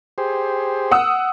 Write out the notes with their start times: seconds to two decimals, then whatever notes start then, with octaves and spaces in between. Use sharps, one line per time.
0.18 G4 G#4 C5
0.91 F#5 D#6 E6